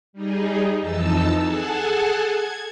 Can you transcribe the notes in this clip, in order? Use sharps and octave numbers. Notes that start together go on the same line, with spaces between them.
G3 D#4 G#4
F2 E3 D#4 A5 E6
G#4 A4 F#5 G#5 A5
G#6